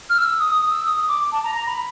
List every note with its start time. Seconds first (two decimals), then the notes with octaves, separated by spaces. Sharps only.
0.09 F6
0.16 E6
0.39 D#6
0.54 D#6
0.70 E6
0.85 D#6
1.08 D6
1.32 A5
1.43 A#5
1.55 A#5
1.67 B5